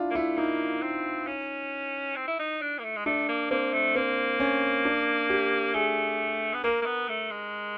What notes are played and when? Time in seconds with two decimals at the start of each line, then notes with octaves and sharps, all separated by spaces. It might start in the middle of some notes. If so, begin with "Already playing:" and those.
Already playing: D4 E4 F4
0.11 A#3
0.15 A3 E4
0.37 A#3 D#4
0.82 C4
1.27 C#4
2.16 C4
2.28 E4
2.39 D#4
2.61 D4
2.79 A#3
2.84 A3
2.96 G#3
3.06 A3 D4
3.28 A#3
3.51 A#3 C4
3.73 A3
3.96 A#3 C4
4.40 C#4
4.85 D4
5.30 G4
5.74 A3 G#4
6.54 B3
6.64 A#3 A#4
6.82 A#3
6.86 B3
7.09 A3
7.31 G#3